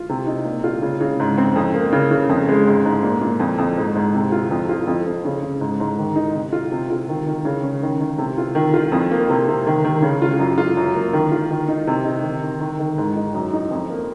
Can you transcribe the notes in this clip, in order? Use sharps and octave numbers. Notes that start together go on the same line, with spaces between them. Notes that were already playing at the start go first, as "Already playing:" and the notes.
Already playing: F4
C3
D#4
A#2
F4
C#3
C#3
G#2
C4
F2
A#3
C#3
C#3
F2
G#3
G#2
G#2
A#2
A#2
F2
F2
G#2
G#2
C3
F4
F2
F4
F2
F2
C#3
C#3
G#2
G#2
D#3
D#4
C3
F4
C3
F4
D#3
D#3
C#3
C#4
D#3
D#3
C3
F4
D#3
F4
F2
A#3
C3
C3
D#3
D#3
C#3
F4
F#2
F4
F#2
A#3
D#3
F4
D#3
D#4
C3
D#4
D#3
D#3
D#3
D#3
G#2
D#4
F#2
D#4
F2
A#3